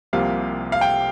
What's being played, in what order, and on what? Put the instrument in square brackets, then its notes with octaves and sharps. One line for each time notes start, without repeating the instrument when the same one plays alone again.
[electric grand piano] C2 C3 F3 A#3 G4 [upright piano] F5
[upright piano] F5
G5